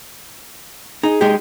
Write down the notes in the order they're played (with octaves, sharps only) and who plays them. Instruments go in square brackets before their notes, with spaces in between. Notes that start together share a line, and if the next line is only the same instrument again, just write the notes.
[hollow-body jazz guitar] D#4 [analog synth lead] G#4
[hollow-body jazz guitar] G#3 D#4 G4